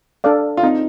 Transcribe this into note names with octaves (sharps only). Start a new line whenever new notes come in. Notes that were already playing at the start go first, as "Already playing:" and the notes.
D4 A4 D5 F5
F4
C4 D#4